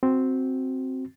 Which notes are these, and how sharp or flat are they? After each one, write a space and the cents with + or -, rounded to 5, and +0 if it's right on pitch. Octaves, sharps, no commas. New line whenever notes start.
C4 +0 F#4 +0